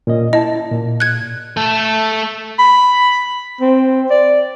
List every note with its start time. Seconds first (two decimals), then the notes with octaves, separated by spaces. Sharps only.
0.07 A#2 C#4 D#5
0.33 E4 D#5 A5
0.71 A#2
1.00 F#6 G#6
1.57 A3 A4
2.59 B5
3.61 C4
4.11 D5